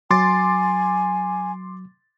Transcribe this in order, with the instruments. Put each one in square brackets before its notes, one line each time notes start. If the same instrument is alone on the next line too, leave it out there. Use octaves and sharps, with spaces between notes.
[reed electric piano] F#3 [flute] G#5 [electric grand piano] C6 D6 A6